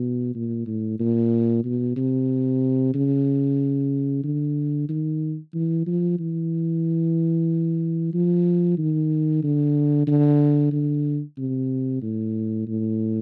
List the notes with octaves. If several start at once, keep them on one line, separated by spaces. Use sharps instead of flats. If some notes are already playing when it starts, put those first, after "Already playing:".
Already playing: B2
A#2
A2
A#2
B2
C3
C#3
D3
D#3
E3
F3
E3
F3
D#3
D3
D3
D3
C3
A2
A2